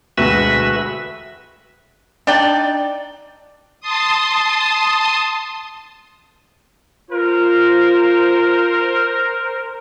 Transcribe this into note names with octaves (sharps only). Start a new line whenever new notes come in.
E1 D2 F#4 B4 E5
D4 D#4 D5 G5
A5 C6 D#6
F4 A#4 C5